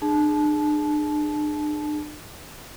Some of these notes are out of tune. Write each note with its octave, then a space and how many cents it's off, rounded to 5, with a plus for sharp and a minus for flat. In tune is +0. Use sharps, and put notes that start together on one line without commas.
D4 +40 G#4 +0 A5 -30